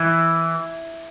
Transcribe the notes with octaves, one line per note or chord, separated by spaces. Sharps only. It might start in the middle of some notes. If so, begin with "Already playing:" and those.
Already playing: E3